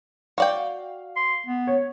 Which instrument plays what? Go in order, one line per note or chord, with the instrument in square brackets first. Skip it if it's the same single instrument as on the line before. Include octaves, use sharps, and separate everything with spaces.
[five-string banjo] F#4 D5 G5 [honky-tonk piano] F5
[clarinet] C6
B3
[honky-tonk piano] C#5